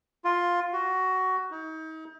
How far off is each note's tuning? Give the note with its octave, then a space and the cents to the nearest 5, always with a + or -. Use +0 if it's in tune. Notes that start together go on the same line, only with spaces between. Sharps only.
F4 +10
F#4 +15
D#4 +35